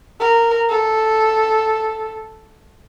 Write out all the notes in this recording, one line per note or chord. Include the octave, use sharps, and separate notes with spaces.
A#4
A4